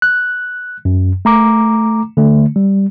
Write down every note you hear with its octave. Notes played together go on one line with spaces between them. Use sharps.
F#6
F#2
A3 A#5 D6
D3 A3
G3